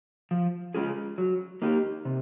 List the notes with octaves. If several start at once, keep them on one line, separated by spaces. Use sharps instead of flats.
F3
G#3 C#4 F4 G#4
F#3
A#3 D#4 G4
C3